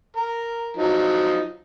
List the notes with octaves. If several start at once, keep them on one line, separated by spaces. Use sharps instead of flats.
A#4
F3 F#3 D#4